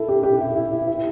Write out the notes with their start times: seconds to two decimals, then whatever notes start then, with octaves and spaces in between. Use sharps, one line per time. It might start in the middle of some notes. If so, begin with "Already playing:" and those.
Already playing: E4 A4
0.08 G4
0.23 G4
0.40 E4
0.55 E4
0.71 E4
0.87 E4